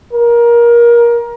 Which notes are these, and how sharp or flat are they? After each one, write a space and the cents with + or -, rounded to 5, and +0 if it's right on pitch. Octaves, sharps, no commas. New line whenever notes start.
A#4 +20